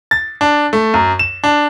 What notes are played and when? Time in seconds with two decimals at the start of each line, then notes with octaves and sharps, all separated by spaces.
0.11 A6
0.41 D4
0.73 A3
0.94 F#2
1.19 E7
1.44 D4